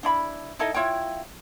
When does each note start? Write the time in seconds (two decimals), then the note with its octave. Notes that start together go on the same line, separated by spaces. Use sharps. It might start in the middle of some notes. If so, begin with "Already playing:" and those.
0.03 D4 E4 B5
0.59 D#4 E4 A4 D#5
0.74 E4 F4 C#5 G5